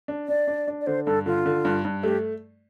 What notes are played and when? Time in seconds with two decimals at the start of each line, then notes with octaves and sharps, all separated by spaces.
0.08 D4
0.28 D4 D5
0.47 D4
0.68 D4
0.81 D5
0.87 D3 C5
1.06 G2 A4
1.26 D3 F4
1.46 D3
1.65 G2
1.85 G2
2.03 A3 G4